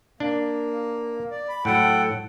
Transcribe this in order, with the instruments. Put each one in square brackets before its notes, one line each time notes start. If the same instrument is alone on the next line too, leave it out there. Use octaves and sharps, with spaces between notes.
[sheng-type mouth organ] A#3 [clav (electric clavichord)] D4
[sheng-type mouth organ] D5
B5
[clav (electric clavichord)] A2 F#3 [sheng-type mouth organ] A4 F#5 G5